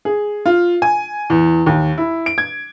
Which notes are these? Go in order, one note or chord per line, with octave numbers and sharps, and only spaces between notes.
G#4
F4
G#5
E2
D#2
E4
D7
G#6